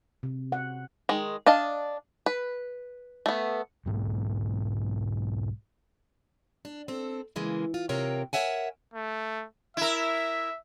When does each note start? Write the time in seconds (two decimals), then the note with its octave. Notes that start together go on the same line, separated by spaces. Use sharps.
0.23 C3
0.52 F#5
1.09 D#3 G#3
1.46 D4 D#5 F5 A5
2.26 B4
3.26 A3 B3
3.86 B1 G#2 A#3
6.65 D4
6.88 C4 A4
7.36 C#3 E3 G#3 A#3
7.74 F4
7.89 C3 F4 A#4 C#5 G5
8.33 A#4 C#5 E5 F#5 G#5
8.94 A3
9.77 E4 A#4 E5